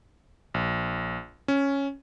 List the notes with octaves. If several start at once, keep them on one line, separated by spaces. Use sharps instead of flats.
A#1
C#4